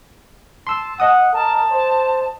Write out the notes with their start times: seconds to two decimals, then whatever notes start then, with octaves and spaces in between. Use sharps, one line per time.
0.67 A5 C6 E6
1.00 D#5 F#5 D#6
1.33 A#4 A5
1.71 C5